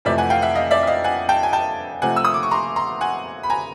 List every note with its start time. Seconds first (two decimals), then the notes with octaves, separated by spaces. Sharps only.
0.05 F2 C3 E3 A3 D5 E5
0.18 F#5 G#5
0.30 F5 G5
0.42 E5 F#5
0.55 D#5 F5
0.71 D5 E5
0.83 E5
0.87 D#5 F5
1.04 F#5 G#5
1.29 G5 A5
1.43 G#5
1.53 G5 A5
2.02 C3 F3 A3 F#5 G#5
2.16 E6
2.25 D#6
2.34 D6
2.43 C#6
2.51 A#5 C6
2.76 A#5 C6
3.01 F#5 G#5
3.43 B5
3.50 G#5 A#5